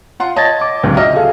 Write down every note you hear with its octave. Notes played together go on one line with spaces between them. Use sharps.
F4 F#5 C6
C#5 D#5 A5 G#6 A6
D6
C#2 G2 D3 F#3 C4
F#4 D#5 E5 F6
G#4 A4 F5